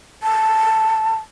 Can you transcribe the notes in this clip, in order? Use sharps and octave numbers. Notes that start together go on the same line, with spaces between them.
A5